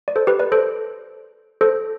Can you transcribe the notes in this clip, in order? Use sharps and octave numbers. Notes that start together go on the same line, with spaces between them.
D5
A4 C5
G4 B4
B4 D5
A4 C5
A4 C5